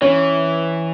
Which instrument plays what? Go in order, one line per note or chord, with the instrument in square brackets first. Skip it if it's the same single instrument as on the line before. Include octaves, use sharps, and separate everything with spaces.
[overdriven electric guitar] E3 [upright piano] C#4